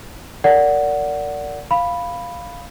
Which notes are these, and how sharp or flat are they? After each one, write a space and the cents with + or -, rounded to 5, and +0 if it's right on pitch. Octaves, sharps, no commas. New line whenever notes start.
A#4 -25 D5 -20 F#5 +0
F5 +0 B5 +0